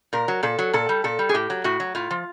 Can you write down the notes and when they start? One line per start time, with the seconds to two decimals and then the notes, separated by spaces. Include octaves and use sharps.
0.13 A#2 A#4
0.28 F#3
0.43 A#2 A4
0.59 F#3
0.73 A#2 A4
0.89 G3
1.04 A#2 A4
1.19 G3
1.29 G#4
1.34 A2 G4
1.50 F#3
1.64 A2 F#4
1.80 F#3
1.95 A2 F4
2.11 F3